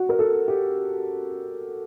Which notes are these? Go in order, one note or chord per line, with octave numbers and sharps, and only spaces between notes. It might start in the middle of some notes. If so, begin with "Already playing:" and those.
Already playing: F#4
A#4
A4
G4